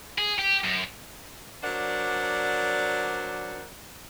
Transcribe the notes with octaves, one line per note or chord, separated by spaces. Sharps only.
G#4
G4
F#2
F#3 D4 A#4 C5 D5 F#5